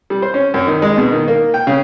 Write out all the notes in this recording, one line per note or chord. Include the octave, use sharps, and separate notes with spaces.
G3
C5
C#4
F#2
D#3
G#3
B2
D#3
A#3
G5
C#3